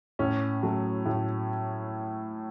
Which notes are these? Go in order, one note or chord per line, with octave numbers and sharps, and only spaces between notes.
A2 C#4
F#3 A3
A2